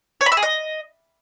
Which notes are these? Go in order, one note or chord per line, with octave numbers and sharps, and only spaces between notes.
C#5
B5
E5
G#4
D#5